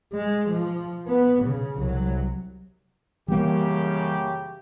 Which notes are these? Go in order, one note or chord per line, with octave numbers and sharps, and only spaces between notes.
G#3
F3
B3
C#3
C2 F#3
F#2 C#3 E3 G3 A#3 G4